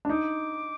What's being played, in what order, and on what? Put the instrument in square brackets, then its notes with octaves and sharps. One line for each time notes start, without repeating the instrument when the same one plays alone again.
[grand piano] D4
[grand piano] D#4 [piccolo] D6